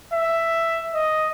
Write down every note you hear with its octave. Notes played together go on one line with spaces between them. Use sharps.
E5
D#5